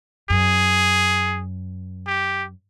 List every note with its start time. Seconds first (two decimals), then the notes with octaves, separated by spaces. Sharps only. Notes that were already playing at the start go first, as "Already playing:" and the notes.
0.30 F#2 G#4
2.07 G4